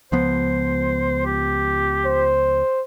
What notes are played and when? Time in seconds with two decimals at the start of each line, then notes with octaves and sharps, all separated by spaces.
0.12 C#2 F3 B3 C5
1.26 G4
2.05 C5